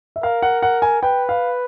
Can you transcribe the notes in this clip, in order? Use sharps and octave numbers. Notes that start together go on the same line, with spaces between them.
E5
A#4 F5
F#5
F#5
G#5
B4 G5
F5